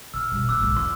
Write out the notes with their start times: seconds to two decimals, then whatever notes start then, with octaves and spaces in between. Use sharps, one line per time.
0.14 C3 E6 F6
0.31 G2 B2
0.49 A#3 D6 E6 F#6
0.60 B1 G#2
0.76 E2 C6